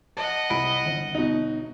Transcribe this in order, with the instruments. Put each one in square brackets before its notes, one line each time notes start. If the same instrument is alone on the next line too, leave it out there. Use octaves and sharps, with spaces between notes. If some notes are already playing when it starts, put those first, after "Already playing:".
[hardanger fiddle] D#5 F#5 [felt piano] A5
[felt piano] C2 B5 D7
G1
[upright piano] B2 D#4